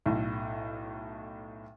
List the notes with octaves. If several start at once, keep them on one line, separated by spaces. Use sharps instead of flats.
B1 A2